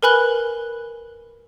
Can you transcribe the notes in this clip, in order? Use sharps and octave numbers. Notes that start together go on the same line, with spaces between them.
A#4 B4 G#5 B5 F#6 G7